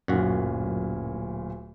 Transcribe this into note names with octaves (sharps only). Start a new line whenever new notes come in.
D1 F#2 A#2 F#4